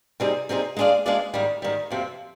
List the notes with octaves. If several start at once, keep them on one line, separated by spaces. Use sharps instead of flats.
C3 G3 C4 D#4 G#4
C3 G3 C4 D#4 G#4
G#3 D4 G#4 D5 F5
G#3 D4 G#4 D5 F5
G#2 D#3 G3
G#2 D#3 G3
F2 C3 F3 C4